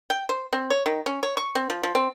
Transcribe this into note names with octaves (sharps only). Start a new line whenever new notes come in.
G5
C5
C4
C#5
D#3
C#4
C#5
C#6
C4
F3
F3
C4